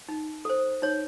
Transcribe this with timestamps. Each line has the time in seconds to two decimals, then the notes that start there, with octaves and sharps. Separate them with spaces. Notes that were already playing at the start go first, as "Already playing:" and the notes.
0.09 D#4
0.45 A4 C5
0.82 D#4 C#5